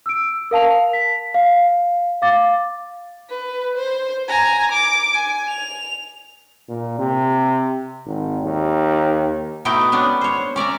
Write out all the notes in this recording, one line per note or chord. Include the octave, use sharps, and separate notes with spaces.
E6 D7
A#4 F5 A5 F7
B6
F5
F5 D6 A6
B4
C5
G#5 A#5
D6
G#5
F7
A#2
C3
G#1
D#2
B2 A3 D#4 E4 G5
B3 C#4 D4
C5 C#5
C#4 D5 E5 A#5